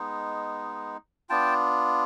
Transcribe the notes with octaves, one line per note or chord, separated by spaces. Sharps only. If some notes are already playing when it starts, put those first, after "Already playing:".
Already playing: G#3 B3 D#4
B3 D4 F4 G5 A5